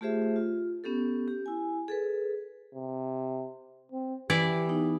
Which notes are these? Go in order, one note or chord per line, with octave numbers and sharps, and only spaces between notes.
A3 F4 G4 G#4 C5 E5
F4
B3 C#4 G4 A4
G4
E4 G#5
G#4 A4 B4
C3
C4
E3 E4 G4 D5
B3 D#4